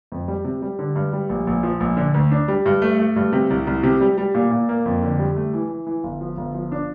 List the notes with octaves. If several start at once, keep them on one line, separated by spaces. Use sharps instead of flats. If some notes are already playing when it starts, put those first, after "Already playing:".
F2
G3
C3
G3
D3
G2
G3
A#1
A#1
F3
A#1
D3
D2
D4
G3
G2
A3
A3
G2
C3
C2
C2
C3
G3
G3
A#2
A#2
A#3
F2
D3
G3
A3
E3
E3
E3
G1
F3
G1
F3
D4